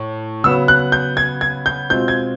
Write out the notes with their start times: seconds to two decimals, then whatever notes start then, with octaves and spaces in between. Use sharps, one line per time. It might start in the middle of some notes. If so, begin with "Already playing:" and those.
Already playing: A2
0.44 C#3 F#3 B3 E6
0.68 F#6
0.92 G6
1.17 G#6
1.41 G#6
1.66 G6
1.90 B2 G#3 C4 F4 G6
2.08 G#6